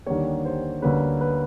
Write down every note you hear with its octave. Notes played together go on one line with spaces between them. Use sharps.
D#2 D3 G3 A#3 C#5
C5
D2 D3 G3 A#3 C#4 B4
B4